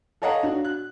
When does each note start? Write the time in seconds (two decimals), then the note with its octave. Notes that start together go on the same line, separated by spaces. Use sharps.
0.22 A4 C#5 D#5 F5 F#5 A#5
0.43 D4 F#4
0.64 F#6